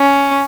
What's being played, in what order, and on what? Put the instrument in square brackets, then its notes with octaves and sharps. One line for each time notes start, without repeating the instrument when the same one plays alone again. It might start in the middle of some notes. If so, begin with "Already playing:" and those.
Already playing: [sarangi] C#4